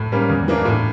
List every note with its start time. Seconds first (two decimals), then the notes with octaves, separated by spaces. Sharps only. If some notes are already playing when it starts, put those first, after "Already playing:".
Already playing: A2
0.12 G3 A#3 C#4
0.29 E2
0.48 E3 A#3 D4
0.65 A2